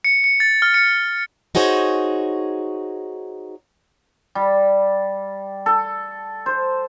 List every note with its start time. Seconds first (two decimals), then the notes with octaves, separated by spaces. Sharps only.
0.05 C#7
0.24 C#7
0.40 A6
0.62 F6
0.74 C#7
1.55 D#4 F#4 G#4 C5 C#5
4.35 G3
5.66 A4
6.46 C5